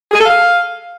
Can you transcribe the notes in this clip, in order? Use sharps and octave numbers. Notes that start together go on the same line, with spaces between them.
G#4
A4
F5